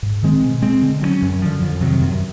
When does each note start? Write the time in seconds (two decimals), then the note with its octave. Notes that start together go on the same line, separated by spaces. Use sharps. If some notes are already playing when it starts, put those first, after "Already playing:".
0.03 G#2
0.22 D#3 G#3 C4
0.42 B2
0.62 G#3 C4
0.82 D3
1.02 F#3 A#3 C#4
1.22 F#2
1.42 D3 F3
1.61 F2
1.81 C3 D#3 F#3
2.01 F#2